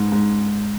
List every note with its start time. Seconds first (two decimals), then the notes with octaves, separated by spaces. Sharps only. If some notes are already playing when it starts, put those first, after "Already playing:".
Already playing: G#2
0.12 G#2